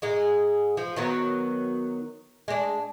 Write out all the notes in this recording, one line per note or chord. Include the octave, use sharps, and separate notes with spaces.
G#2 G#3
F3
D#3 F#3 B3
G#3 D4